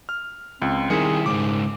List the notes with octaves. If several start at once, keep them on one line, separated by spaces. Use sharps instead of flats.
F6
C#2 C4
D#3 G3 E4 G#4 C#7
G#2 C#3 G#3 A#4 D6